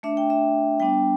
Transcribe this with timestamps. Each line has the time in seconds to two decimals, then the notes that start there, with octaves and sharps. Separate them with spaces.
0.03 A3 D4 E5
0.17 G5
0.30 E5
0.80 G3 B3 D4 G5